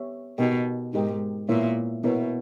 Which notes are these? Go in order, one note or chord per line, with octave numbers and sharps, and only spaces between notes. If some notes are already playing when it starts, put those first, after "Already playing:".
Already playing: B3 G4 C#5 E5
B2 D#4 G4 A#4 D#5 G5
G#2 D#4 G4 A#4 D#5 G5
A#2 B3 E4 A#4 C#5 E5
B2 B3 E4 A#4 C#5 E5